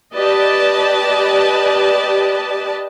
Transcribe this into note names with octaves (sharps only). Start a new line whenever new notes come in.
G4 B4 D5 D#5 A5